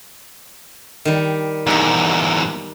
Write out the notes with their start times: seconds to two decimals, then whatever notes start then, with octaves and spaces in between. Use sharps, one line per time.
1.05 D#3 G3
1.67 E2 G#2 G3 D#4